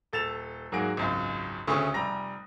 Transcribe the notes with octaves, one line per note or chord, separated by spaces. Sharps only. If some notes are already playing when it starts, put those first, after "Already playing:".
D#1 A4 A6 E7 F7
G#2 F#3 A#3 F#4 G#4 D7
G#1 C#2 F#2
D2 C#3 A3 C#4 C#6 D#6
F1 G3 A#5 A#6